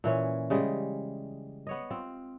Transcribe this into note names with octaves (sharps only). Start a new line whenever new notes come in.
A#2 E3 C#4
C#3 G3 G#3
B3 C#5 D#5
C4 F4